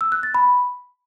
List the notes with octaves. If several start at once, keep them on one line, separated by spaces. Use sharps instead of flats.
E6
F#6
A6
B5